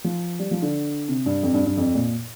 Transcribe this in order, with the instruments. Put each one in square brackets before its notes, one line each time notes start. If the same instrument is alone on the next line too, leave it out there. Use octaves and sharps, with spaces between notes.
[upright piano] F3
G3
F3
D3
C3
G2
F2
G2
G2
F2
A#2